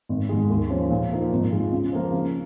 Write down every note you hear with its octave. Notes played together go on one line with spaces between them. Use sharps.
G#1
G#2 D#3 G#3
D#2
C#3 F3 C#4
A#2
F3 A#3 D#4
G#1
G#2 G#3 F4
C#3
F3 A#3
C#3